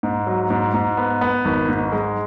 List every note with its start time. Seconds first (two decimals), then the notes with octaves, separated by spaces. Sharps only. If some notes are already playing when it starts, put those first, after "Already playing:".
0.03 G#2
0.27 F#3
0.50 G#2
0.74 G#2
0.97 B3
1.21 B3
1.45 G#1
1.69 G#2
1.92 G#3